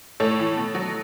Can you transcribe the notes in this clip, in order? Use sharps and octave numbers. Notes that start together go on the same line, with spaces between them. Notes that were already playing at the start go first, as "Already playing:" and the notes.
A2 A4 C#5
E3
B2
F#3